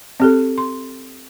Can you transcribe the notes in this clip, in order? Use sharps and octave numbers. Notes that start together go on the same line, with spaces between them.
C4 G4 A4
C6